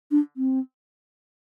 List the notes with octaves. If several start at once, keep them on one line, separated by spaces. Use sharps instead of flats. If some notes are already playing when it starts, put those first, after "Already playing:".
D4
C4